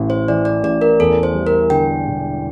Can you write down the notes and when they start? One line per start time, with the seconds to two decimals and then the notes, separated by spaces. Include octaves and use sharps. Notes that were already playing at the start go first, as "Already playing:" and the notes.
Already playing: A1 A2
0.10 C5
0.28 E3 D5
0.45 D5
0.63 A1 D5
0.81 A#4
1.00 E2 A4
1.23 C5
1.34 G3
1.47 A#4
1.70 D3 G5
2.07 E1